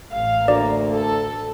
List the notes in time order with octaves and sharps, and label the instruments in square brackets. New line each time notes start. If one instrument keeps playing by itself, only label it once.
[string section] A1 F5
[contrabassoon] D2 [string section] A#3 [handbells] D5
[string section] A4